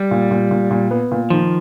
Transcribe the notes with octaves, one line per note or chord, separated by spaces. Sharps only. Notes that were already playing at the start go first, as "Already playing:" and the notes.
Already playing: G3
A#2
A#2
A#2
A#2
B3
A#2
D#3 F3